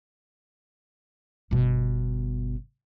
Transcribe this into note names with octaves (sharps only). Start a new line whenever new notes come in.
G1 B2